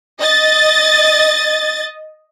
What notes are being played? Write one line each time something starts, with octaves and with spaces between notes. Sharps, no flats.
D#5 A6